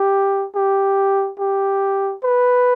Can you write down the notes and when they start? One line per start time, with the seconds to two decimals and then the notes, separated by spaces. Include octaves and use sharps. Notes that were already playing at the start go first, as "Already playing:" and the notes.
Already playing: G4
0.55 G4
1.39 G4
2.23 B4